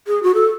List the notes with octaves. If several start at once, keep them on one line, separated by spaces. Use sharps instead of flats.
G#4
F#4
A4